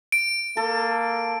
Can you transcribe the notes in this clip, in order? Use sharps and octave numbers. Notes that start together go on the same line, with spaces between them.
D7
A#3 A4